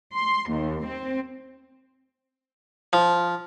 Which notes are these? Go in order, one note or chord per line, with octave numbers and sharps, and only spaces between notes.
C6
D#2
C4
F3